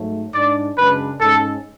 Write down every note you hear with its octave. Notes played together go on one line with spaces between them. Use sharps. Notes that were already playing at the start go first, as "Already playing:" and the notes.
Already playing: G#2 F#3 A3
G#2 G#3 D4 D5
F#2 C#3 G#3 D4 B4
G#2 G#3 C#4 A4